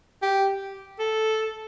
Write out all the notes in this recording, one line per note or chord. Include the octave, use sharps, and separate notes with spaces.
G4
A4